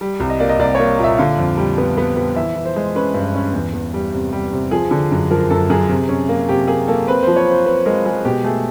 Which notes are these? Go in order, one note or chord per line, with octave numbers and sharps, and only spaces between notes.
G3
C2
D#5
A#3 D5
D#5
C2 D5
C#5
A#3
A#2
E5
D3 F5
F2
G3
B3
B3
B3
E3 E5
E3
C5
G#3
C#4 B4
G2
C#4
E2
E2
G3
C3
G3
C3
F3 G#4
D3
F#2
F3 A#4
F#2 A4
F#2 G#4
C3
C#4
A#3
C3 G4
A#3 G#4
A#3 A4
C4 B4
F3 C5
C#5
C4 C5
C4 B4
G#3 A#4
G#3 G#4
B2 G4
A3 G#4